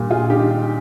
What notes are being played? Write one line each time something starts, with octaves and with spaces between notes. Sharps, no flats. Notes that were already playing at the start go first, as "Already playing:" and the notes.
Already playing: A#2 G3
F4 G#4
D#4 G4